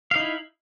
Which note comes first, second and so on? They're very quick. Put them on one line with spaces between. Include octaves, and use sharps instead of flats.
F5 D#4 E4